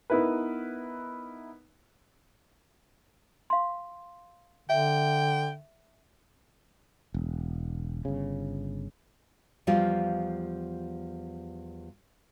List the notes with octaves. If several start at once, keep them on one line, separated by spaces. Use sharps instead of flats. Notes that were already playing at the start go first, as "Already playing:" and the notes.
B3 D#4 E4 A#4 B4
F5 C6
D3 E5 G5
E1
G1 C#3
E2 F3 G3 F4 G5